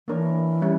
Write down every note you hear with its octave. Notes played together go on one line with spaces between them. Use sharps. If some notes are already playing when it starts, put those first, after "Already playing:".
E3 A#3 D4 A#4 C#5
G3 C#4 E4